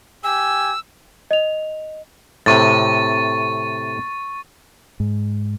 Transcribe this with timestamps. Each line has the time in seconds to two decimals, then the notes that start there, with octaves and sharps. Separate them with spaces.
0.24 G4 G#5 E6
1.31 D#5 F7
2.46 A2 C3 C#6 A6
5.00 G#2